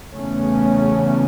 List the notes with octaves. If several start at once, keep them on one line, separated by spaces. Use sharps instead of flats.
E2 C#3 A3 C#4